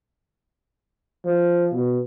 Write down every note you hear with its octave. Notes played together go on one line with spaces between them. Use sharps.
F3
B2